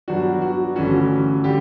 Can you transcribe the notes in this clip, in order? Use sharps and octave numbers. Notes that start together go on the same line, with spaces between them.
G2 F#3 B3 D4 F#4
F#4
G1 G2 E3 A3 C#4 F#4
D3 G3 G4